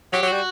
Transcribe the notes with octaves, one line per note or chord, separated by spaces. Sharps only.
F#3 G4
F#3
G3 F#4